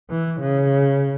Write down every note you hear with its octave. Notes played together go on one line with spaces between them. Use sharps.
E3
C#3